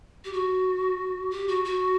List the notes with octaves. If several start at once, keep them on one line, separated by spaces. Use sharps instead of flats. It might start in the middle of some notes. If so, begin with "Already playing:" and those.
G4
F#4
G4
F#4
F#4